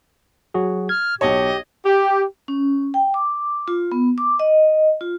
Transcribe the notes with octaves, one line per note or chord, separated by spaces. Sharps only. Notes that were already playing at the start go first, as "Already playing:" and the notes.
F#3 F#4 G#4
F6 G#6
B1 G4 C#5 D#5 A5
G4
C#4
G5
D6
F4
B3
D6
D#5
F4